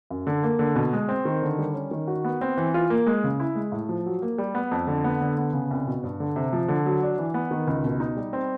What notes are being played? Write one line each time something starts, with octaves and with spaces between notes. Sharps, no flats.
F#2
D3
A#3
D3
B2
G#3
C4
D#3
D3
G3
C#4
D#3
F#4
B3
C4
E3
F4
A#3
G#3
C#3
E4
G#3
A2
F3
F#3
A#3
G3
B3
F2
D3
B3
D3
B3
C#3
C2
B2
G2
D3
C3
F3
D3
F#3
D4
E3
B3
D#3
C#2
B2
D#4
G3
C4